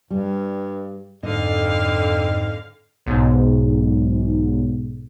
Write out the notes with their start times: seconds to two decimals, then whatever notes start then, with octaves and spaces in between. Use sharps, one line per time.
0.10 G2 G3
1.23 F2 G#2 D3 D#5 F5
3.06 B1 G#2